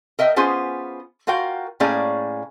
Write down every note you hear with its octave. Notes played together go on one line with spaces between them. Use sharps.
A#4 D#5 E5 G5
B3 C#4 F4 G#4 C5
F4 F#4 A#4 F5 G5
A2 A#3 C#4 G#4 D5 F5